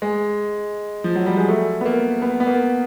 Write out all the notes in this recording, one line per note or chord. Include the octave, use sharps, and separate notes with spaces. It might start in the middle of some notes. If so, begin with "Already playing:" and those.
G#3
F3
F#3
G3
G#3
A3
B3
A#3
B3
B3
A#3